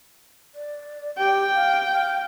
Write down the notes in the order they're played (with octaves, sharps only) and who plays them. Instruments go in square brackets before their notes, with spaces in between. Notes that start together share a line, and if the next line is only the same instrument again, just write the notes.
[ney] D5
[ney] G4 [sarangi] G5
[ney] F5
F5